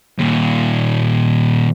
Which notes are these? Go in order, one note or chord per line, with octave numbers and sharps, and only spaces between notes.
D#2 A#2